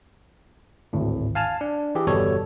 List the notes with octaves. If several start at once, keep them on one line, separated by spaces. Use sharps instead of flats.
G#1 D2 A2
F5 G#5 A5 F6
D4
E3 G4 G#4
G1 E2 B2 G3 A4 C#5